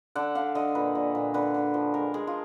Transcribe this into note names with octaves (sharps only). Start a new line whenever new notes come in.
D3 F#5
D3 F5
D3 D#5
A#2 B4
A#2
A#2
D3 B4
D3
F3
G#3 A#4
G#3 G#4
F4